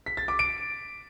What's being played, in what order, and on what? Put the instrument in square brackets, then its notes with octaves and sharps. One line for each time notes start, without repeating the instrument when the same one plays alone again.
[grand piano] B6
A6
D6
D7